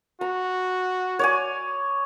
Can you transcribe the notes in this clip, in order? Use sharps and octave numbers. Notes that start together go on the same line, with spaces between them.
F#4 A#5
C#5 D5 G#5